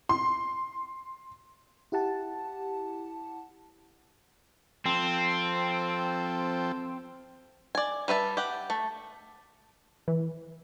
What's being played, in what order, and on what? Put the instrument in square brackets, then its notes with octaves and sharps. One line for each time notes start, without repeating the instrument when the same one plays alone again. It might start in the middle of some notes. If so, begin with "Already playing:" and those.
[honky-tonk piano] C6
[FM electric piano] E4 G4 F#5 A5
[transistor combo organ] F3 A4 G5 [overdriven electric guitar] C4
[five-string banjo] D5 G#5
G3 B4 E5 A5
G4 F#5
A3
[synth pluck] E3